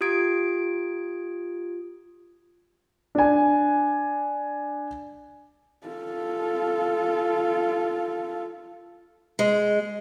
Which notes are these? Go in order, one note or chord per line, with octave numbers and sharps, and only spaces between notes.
F4 G4 D#6 G#6 D7
D4 G#5
F4 A4
G#3